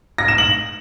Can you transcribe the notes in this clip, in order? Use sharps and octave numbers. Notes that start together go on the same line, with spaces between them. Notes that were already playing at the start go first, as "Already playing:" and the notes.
A#6
E7
F#7